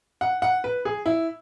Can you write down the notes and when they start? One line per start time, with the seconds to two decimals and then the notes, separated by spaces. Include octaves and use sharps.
0.21 F#5
0.42 F#5
0.64 B4
0.85 G#4
1.06 E4